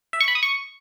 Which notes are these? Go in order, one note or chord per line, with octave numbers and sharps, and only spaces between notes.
E5
C#6
B5
D#6
C#6